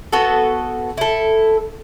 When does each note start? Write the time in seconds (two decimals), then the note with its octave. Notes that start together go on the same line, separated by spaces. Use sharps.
0.12 B3 F#4 A4
0.98 E4 A4